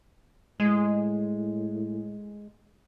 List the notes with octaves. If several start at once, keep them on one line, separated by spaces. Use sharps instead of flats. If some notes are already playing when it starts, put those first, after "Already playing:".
A2 G#3